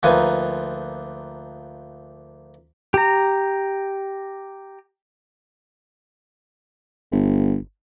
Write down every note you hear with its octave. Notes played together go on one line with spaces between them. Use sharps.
D2 F3 A#3 D#4 B4 G#5
G4 A#5
G1